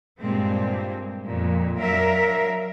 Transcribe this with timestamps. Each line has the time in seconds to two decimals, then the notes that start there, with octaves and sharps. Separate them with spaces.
0.19 G2 A#2 G#3 C4
1.27 F2 A#2
1.78 F#3 D4 A#4 E5 F5